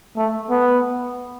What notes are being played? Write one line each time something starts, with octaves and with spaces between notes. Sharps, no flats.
A3
B3